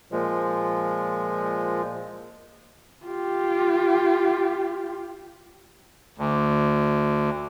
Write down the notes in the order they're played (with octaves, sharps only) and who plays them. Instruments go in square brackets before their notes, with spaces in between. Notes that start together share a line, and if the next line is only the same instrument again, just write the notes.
[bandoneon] A#2 F3 G#3
[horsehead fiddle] F4 G4
[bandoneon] D2